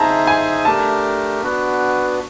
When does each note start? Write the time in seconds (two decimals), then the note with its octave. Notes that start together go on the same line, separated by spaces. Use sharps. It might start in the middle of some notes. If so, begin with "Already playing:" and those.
Already playing: D#4 G#4 C5 E5 A5 A#5
0.27 G#5
0.65 A3 D4 G4 A#4 A5
1.42 B3 D4 F#4 B4